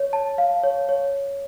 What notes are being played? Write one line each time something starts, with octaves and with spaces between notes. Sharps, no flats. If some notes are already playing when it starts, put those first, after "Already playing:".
Already playing: C#5
A5
F5
C#5
C#5